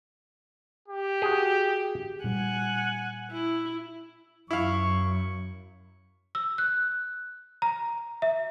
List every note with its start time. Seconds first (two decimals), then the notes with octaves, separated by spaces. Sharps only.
0.88 G4
1.22 F#4 G#4
2.24 A#2 G3 F#5 G#5
3.32 E4
4.51 F#2 E4 F5 C#6
6.35 E6
6.58 F#6
7.62 A#5
8.22 E5